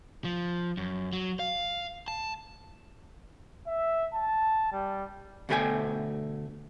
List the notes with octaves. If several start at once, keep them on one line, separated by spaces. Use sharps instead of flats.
F3
F#2
F#3
F5
A5
E5
A5
G3
D2 B2 A3 A#4 G5 G#5